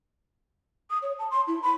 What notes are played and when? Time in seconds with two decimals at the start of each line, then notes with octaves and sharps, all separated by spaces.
0.90 D#6
1.02 C#5
1.19 A5
1.31 C6
1.48 E4
1.63 B5